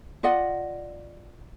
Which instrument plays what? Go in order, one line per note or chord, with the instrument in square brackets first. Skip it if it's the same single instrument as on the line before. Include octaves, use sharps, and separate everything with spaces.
[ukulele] F4 D5 D#5 F#5